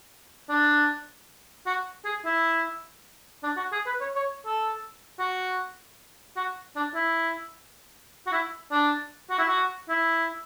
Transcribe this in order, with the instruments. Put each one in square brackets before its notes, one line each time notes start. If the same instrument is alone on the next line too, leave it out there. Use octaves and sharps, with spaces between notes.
[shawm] D4
F#4
G#4
E4
D4
F#4
G#4
B4
C#5
C#5
A4
F#4
F#4
D4
E4
F#4
E4
D4
F#4
E4
F#4
E4